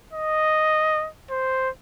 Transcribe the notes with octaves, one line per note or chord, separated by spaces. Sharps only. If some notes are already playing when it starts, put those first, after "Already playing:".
D#5
C5